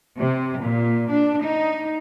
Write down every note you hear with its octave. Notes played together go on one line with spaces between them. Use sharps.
C3
A#2
D4
D#4